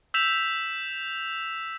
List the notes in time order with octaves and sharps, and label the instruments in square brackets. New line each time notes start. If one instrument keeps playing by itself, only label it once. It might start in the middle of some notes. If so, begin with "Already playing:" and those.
[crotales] E6 G6 B6 E7 F7